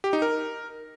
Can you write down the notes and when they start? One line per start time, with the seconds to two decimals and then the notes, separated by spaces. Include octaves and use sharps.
0.04 G4
0.13 D#4
0.22 A#4